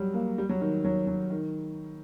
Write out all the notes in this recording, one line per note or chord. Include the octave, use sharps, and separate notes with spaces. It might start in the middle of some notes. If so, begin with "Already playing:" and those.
Already playing: F#3 G3
A#3
G3
F#3
D#3
F#3
F#3
D#3